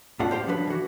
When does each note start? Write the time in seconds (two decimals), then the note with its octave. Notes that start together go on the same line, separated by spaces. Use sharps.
0.19 A2 A3 D4 F4 F#5
0.31 G4 C5 F5 G5
0.47 D3 F3 F#3 D4 B4
0.67 E3 F#4